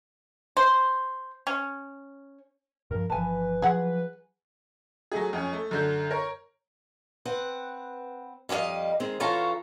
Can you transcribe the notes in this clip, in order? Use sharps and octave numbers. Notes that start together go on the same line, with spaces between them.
C5
C#4
G2 F3 A#4
G1 E3 F3 B4 G#5 A5
F3 F#3 G#4 F#5
F#3 A3 G#4
F2 C#4 G#5
A3
F#2 D3 G6
A#4 C#5
C4 B4 F#5
F2 G3 F#4 D#5 F5
D#3 G#3 C4
E3 C#4 F4 F#4 A4 A#5